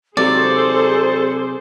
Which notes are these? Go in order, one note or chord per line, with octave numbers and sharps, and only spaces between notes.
C3 F#3 G#4 A4 C5 D5